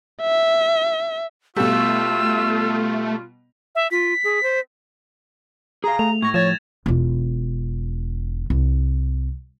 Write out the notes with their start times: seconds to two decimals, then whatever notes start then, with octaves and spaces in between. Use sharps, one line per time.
0.22 E5
1.56 B2 G3 A3 F4 E6
3.75 E5
3.91 F4 B6
4.24 G#4
4.43 C5
5.84 G#4 F5 A#5
5.99 A3 F7
6.22 A2 C#6 G#6 A#6
6.34 F3 C#5 G#6 A6 E7
6.86 E1 F4
8.50 C2